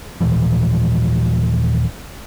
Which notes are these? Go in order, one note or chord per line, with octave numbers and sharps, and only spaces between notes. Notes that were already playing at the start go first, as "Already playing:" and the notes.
D#2 A#2 E3 F3